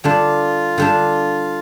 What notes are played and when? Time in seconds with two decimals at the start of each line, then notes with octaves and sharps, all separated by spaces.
0.04 D3 G3 D4 F4
0.78 D3 G3 D4